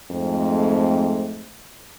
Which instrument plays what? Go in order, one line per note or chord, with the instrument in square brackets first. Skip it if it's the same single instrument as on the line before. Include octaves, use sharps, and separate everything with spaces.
[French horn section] F2 G#2 A3 C4